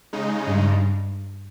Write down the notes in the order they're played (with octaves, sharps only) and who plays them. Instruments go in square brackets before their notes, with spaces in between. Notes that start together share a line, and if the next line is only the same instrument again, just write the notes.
[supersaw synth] C#3 G#3 D#4
[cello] G2